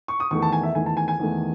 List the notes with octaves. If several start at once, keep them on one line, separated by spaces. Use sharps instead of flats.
C#6
D#6
E2 D#3 A3 C#6
A5
G#5
E5
E2 D#3 A3 G#5
A5
G#5
G#5
E2 D#3 A3